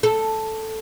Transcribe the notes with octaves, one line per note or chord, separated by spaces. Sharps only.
A4